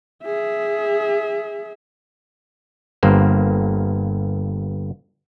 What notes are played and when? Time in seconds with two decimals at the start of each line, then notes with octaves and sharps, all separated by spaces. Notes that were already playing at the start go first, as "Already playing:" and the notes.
0.24 G#4 E5
3.03 G1 G2 A#3 C5